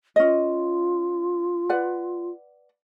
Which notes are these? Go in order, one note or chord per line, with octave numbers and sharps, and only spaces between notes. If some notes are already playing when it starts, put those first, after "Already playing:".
C#4 F4 D#5
B4 D5 F#5